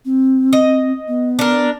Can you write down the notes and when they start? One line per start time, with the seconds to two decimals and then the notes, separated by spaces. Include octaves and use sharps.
0.05 C4
0.53 D#5
1.08 B3
1.39 D4 A#4